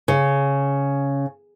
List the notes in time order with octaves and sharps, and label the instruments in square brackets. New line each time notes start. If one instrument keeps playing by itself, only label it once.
[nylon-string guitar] C#3